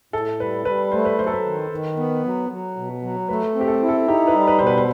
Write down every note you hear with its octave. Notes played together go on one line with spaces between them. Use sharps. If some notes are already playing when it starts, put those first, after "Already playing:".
A2 A4
G3 B4
G3 B4
A3 C5
B4
F#3 C5
A4
B4
D#3
D#3
B3
F#3
F#3
B2
F#3
A3 B4
C4
G4
A4
E4
A4
D#4 G4
B4
G3
B4
B2 C5
B4
C5